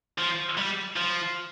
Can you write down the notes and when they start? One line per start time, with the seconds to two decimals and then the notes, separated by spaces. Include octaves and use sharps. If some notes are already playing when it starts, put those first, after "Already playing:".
0.18 F3
0.57 G3
0.96 F3